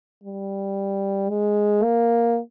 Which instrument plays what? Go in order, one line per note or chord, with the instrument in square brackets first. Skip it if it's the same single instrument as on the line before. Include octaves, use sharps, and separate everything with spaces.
[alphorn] G3
G#3
A#3